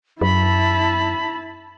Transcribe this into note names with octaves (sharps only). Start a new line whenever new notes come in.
F#2 E4 A5 B5